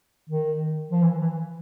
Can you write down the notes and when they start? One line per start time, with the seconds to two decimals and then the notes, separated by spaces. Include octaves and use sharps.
0.30 D#3
0.91 F3
1.03 E3
1.21 E3